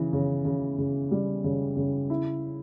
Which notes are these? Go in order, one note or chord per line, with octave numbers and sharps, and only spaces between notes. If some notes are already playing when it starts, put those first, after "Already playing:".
Already playing: C#3 E3
C#3
C#3
C#3
G3
C#3
C#3
E4